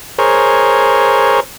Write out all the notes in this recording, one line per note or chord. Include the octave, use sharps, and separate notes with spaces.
G#4 A#4 C5 C#5